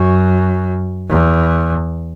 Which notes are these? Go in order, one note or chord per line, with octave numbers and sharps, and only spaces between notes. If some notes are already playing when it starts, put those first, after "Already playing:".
Already playing: F#2
E2